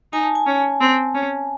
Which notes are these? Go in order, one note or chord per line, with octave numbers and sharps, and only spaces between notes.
D#4 G#5
A5
G#5
C#4
C4
C#4